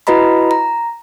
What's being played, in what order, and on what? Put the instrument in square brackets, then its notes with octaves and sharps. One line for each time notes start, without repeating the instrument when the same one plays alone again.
[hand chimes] E4 F#4 B4 D#5 A#5 B5
A#5